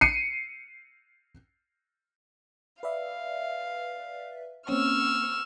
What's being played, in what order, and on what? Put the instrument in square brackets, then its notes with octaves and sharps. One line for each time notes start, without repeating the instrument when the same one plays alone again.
[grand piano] C7 C#7 D#7
[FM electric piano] B4 D5 E5 [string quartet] F5
[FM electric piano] A#3 C4 C#4 [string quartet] C#6 E6 F6